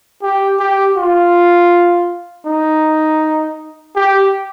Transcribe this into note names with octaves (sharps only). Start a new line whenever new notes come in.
G4
G4
F4
D#4
G4